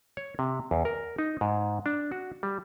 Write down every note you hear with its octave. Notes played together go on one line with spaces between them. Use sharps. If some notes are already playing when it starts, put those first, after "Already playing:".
C#5
C3
E2
A#4
D#4
G#2
D4
F#4
G3